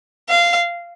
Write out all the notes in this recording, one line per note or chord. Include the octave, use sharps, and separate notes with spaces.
F5